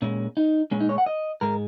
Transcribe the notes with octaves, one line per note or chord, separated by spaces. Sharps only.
A#2 G#3 C#4
D#4
A#2 G#3 C#4
D#4
C#5
F#5
D#5
G#2 G#3 A#4